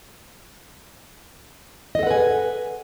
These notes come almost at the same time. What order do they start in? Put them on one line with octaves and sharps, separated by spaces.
D#5 A4 F#5 B4 G#5